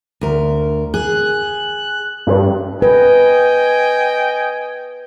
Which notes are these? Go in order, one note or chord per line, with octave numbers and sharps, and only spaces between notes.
D2 A#4
G#4 F#6
G2
B4 D#5 G5 G#5